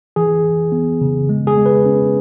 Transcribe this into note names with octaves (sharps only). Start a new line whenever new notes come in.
E3 G#4
E3
B3
C#3
G#3
G#4
G#3
B4
C#4